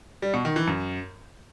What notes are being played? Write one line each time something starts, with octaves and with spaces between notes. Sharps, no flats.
G3
B2
D#3
E3
F#2